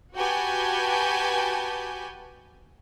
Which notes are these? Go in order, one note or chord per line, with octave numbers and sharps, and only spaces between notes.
F#4 G4 B4 G#5 A5 G6